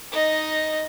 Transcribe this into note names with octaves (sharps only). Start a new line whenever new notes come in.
D#4 D#5